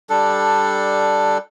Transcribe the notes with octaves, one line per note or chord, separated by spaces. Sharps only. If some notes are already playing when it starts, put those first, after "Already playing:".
G3 D4 A4